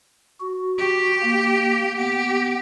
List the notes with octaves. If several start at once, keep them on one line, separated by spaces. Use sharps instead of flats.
F#4
G4
A#3
B3 G4